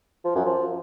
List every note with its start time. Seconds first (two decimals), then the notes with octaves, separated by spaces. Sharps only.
0.25 F3
0.35 F#2
0.46 F3